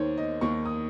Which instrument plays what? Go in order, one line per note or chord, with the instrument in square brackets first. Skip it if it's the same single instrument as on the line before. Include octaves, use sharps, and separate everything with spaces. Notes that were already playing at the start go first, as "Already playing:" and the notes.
Already playing: [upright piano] D#2 D#3 A#3 C5 C#5
D#5
D#2 D#3 A#3 C#6
D#6